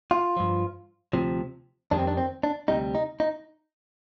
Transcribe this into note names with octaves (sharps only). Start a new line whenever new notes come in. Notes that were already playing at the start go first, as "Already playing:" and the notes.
F4
G2 F3
D2 C3 F3
F2 D#3 G3 D4
C4
D4
C4
D4
D2 C3 G3 D#4
D#4
D#4